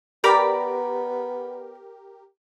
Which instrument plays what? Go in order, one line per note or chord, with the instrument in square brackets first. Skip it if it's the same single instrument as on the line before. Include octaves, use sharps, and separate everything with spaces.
[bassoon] B3 [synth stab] G4 A#4 [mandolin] D5 A#5 B5